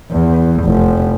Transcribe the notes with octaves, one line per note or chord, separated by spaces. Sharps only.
E2
F1